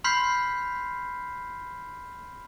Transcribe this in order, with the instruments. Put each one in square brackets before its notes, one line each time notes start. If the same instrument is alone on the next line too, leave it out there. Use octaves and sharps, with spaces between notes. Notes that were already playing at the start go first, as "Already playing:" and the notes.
[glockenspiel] B5 C6 F6 G6 B6 C7